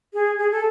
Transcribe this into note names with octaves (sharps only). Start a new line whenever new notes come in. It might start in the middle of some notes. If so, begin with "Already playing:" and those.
G#4
G#4
A4